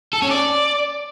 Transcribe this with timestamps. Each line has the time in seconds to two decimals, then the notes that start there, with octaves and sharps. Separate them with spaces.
0.13 A4
0.22 C#4
0.31 D5